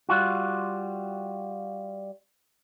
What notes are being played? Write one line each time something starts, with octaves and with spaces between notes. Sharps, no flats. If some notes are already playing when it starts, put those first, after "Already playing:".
G3 F4 F#4